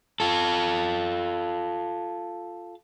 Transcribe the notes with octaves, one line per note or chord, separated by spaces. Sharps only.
F4 A4